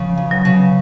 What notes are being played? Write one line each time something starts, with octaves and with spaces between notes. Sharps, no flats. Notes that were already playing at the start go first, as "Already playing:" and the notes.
Already playing: C#3 F3
E2
F#3
C#3